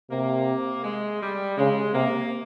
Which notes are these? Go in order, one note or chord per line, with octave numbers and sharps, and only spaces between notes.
C3 A#3
G#3
G3
C#3 G#3
C3 A#3